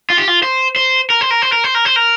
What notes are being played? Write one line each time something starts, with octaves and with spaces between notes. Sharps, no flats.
F4
G4
F4
C5
C5
A#4
C5
A#4
C5
A#4
C5
A#4
C5
A#4